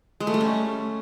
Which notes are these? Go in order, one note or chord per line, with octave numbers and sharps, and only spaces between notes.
G#3
A3
G3
C#4